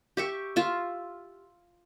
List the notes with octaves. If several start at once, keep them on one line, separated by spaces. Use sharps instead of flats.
G4 E5 C#6
F4 E5